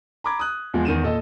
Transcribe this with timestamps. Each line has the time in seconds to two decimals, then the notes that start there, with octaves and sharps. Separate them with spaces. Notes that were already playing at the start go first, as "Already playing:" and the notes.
0.24 A#5 B5 D6 G#6
0.40 D#6 F#6
0.74 E2 F3 G#3
0.85 E2 D#3 D#7 E7
1.03 A#2 A4 D#5